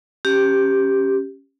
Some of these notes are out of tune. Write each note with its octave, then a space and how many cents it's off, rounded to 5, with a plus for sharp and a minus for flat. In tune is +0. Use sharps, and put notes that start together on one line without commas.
C#4 -10 G4 +0